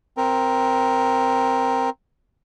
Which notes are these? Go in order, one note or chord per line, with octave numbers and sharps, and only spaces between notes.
C4 A#4